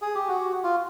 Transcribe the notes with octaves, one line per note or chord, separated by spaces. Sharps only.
G#4
G4
F#4
F4